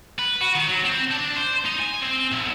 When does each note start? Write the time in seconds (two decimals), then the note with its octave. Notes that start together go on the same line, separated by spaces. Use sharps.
0.19 B4
0.41 F#4
0.55 D#3
0.66 F#3
0.84 C4
1.11 D4
1.36 C5
1.65 D#4
1.80 G#5
2.02 C4
2.32 B1